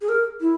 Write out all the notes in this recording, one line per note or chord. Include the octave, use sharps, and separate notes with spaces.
G#4
A#4
E4